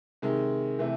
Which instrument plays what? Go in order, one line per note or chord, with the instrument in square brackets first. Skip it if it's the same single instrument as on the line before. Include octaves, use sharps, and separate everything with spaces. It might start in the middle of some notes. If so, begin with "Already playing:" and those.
[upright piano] C3 D#3 G#3
C3 E3 A3